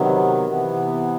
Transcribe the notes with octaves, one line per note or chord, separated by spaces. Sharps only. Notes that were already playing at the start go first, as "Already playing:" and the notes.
Already playing: C3 D#3 F#3 B3
C3 E3 B3